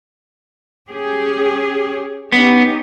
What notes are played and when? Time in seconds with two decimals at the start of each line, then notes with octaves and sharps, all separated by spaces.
0.89 C#4 G4 G#4
2.32 B3 C#4 D#4 G4